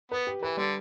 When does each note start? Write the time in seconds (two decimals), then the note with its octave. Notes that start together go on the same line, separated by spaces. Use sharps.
0.11 B3 B4
0.27 G4
0.42 E3 B4
0.57 D3 G3